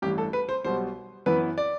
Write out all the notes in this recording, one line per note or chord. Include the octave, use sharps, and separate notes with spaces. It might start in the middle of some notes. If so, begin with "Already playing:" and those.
A1 G2 E3 G4
A4
B4
C5
B1 B2 G3 C5
F#2 E3 B3 E4 B4
D5